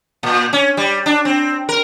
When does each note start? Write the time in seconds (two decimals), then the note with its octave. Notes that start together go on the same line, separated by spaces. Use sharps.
0.23 A#2
0.53 C#4
0.77 G3
1.06 D4
1.25 C4
1.69 A#4